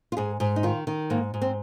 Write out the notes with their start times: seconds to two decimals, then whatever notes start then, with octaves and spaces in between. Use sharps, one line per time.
0.12 F4
0.17 G#2 G#4
0.40 G#2
0.56 D#4
0.63 D#3 F4
0.87 D#3
1.10 G#2 A#3
1.34 G#2
1.42 C4